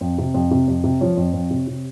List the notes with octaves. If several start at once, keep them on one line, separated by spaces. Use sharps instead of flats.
F2
C3
F2
C3
F2
C3
F3 C#5
F2
F2
C3
C3